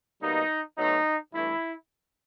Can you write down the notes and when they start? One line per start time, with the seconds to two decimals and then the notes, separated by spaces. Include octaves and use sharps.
0.22 B2 G3 A#3 D#4
0.77 B2 F#3 A3 D#4
1.33 G2 E3 A3 E4